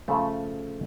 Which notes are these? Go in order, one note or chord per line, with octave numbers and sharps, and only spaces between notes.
C#3 F3 A3